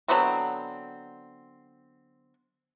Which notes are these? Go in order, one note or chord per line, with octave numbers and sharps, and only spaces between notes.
D3 F#3 B3 C4